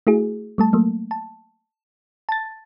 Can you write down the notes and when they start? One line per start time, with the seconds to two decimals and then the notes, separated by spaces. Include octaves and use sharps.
0.07 A3 E4 F#4 G#4
0.58 G3 A3 A5
0.73 F#3 A3 A#3
1.11 A5
2.29 A5 A6